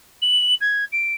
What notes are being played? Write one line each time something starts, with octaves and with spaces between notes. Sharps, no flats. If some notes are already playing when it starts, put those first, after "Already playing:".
F#7
G#6
D7